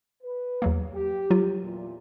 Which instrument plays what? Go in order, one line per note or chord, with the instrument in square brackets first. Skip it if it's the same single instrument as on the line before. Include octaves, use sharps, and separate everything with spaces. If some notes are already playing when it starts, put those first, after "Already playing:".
[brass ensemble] B4
[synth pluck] E2 F#3 A#3
[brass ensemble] G4
[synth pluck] F#3 F4
[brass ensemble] E2 A#2